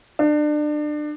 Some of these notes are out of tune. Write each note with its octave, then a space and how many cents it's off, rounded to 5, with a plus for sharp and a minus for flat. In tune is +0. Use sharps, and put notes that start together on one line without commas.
D4 +30